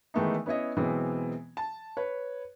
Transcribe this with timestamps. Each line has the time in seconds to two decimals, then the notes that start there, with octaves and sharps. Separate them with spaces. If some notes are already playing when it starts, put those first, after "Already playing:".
0.14 D#3 E3 G#3 A3 B3 D#4
0.46 B3 C#4 E4 C#5 D#5
0.77 B2 E3 F#3 G#3 C4
1.57 A5
1.97 B4 C#5